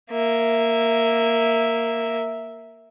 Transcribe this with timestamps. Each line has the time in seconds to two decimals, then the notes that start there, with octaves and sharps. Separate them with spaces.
0.11 A#3 E5